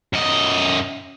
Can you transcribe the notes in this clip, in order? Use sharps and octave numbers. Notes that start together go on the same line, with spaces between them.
F#2 D#5